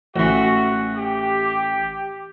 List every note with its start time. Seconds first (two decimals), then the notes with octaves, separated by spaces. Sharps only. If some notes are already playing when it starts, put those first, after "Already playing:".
0.16 A1 E3 F#4
0.98 G4